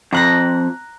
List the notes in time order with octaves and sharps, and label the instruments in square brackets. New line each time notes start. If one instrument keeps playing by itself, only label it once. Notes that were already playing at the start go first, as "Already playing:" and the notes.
[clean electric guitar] F2 [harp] A#5 F#6 A#6